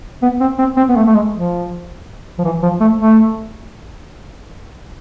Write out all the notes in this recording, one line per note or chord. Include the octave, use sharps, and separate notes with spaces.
B3
C4
C4
C4
B3
A3
A3
G#3
F3
F3
E3
F3
A3
A3